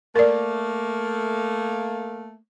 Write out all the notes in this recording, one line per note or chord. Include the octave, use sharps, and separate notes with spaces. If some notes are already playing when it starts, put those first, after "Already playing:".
A3 A#3 A#4 D5